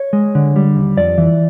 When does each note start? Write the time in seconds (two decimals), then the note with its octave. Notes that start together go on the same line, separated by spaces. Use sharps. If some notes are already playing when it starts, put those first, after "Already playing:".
Already playing: C#5
0.13 G#3
0.35 D3
0.56 G3
0.76 D#2
0.97 F2 D5
1.18 E3